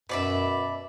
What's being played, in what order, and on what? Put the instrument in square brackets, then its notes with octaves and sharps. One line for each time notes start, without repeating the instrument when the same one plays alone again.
[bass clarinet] F#2 [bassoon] B2 [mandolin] B4 D5 E5